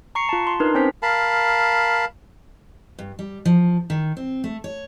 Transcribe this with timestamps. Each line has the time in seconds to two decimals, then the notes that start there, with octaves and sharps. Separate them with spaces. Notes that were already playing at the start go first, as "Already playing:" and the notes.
0.15 A#5 C#6 C7 C#7
0.29 F4 A5
0.47 C6
0.60 D4 D#4 A#4 B4
0.74 C4 C#4 C5 B6
1.03 A#4 F5 A5 B5
2.99 G2
3.19 G3
3.45 F3
3.90 D#3
4.17 C4
4.44 A3
4.64 C#5